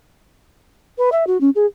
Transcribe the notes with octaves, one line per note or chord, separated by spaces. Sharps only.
B4
E5
F#4
C#4
G#4